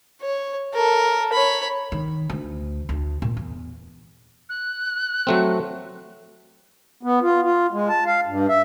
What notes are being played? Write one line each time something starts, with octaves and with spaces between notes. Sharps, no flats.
C#5
A4 A#4
C#5 B5
D#3
D2
D2
A#2
E2
F#6
F#3 A3 C4
B3
F4
F4
G#3
A5
F5
G2
E5